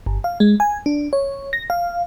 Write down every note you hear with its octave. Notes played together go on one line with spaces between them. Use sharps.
G1
F5
G#3
G#5
D4
C#5
A#6
F5